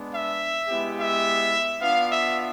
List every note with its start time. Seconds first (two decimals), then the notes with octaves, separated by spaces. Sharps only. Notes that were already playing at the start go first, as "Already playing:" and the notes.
Already playing: G#3 B3 D4
0.13 E5
0.69 G#3 B3 E4 G4
0.97 E5
1.82 B3 D4 F4 F5
2.10 E5